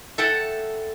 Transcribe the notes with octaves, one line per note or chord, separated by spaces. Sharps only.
A4 E5 F#5 G5 A5